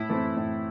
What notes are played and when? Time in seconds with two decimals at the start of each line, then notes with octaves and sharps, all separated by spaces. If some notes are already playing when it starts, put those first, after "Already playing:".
Already playing: A2 E4
0.09 E3 A3 C4
0.37 A2